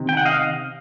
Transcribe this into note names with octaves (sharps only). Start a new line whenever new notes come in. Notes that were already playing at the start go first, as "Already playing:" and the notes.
Already playing: C3 D#3
G5
F#5
D#5 F5